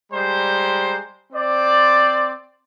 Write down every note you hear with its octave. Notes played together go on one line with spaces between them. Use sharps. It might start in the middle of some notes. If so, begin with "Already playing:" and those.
G3 G#3 C5 A#5
C4 C5 D5